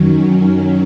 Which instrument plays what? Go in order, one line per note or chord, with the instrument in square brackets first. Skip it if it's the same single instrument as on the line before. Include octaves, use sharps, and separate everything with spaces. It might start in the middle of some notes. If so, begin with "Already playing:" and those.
Already playing: [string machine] F#2 D#3 F#3 C#4